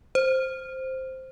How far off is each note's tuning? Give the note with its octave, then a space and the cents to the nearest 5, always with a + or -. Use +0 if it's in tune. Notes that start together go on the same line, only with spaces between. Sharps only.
C5 +0